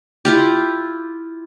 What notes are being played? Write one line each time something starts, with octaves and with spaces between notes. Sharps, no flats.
E4 F4 G4